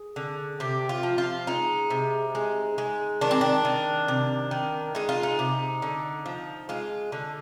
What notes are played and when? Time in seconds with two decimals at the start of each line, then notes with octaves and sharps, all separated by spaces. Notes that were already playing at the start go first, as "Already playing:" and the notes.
Already playing: G#4
0.16 D3
0.60 C3 G4
0.89 F4
1.03 F3
1.18 F4
1.47 G#3 D#4
1.90 C3
2.35 G#3
2.78 G#3
3.21 D#3 D4
3.31 C4
3.41 D4
3.65 D#3
4.08 C3
4.51 D#3
4.95 G#3 D#4
5.09 F4
5.23 D#4
5.39 C3
5.82 D3
6.26 F3
6.69 G#3 F4
7.12 D3